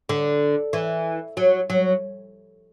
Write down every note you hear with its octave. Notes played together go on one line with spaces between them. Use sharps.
D3
E3
F#3
F#3